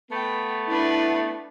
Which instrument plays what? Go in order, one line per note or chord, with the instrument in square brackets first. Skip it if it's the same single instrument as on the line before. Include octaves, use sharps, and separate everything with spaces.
[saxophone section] A3 B3 [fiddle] G5
[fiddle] D4 B4 [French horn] E4